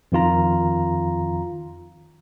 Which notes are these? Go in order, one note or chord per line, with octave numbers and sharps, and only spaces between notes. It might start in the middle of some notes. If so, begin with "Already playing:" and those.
F2 D#3 F4 A#5